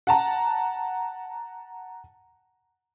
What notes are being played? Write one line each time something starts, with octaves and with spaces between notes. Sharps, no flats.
F#5 A5 A#5